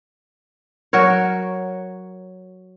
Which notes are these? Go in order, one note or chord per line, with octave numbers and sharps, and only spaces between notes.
F#3 F#4 A#4 C#5